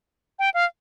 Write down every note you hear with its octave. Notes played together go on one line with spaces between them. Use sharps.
G5
F5